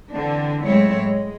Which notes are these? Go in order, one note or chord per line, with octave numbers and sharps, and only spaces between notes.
D3 E3 C4 D4
A2 F#3 G#3 C4 E4 C#5
G#3